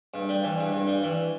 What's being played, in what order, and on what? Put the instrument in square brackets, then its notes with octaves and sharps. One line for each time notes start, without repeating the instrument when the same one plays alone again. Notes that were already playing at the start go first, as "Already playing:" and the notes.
[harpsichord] G2
G3
E3
G2
G2
G3
E3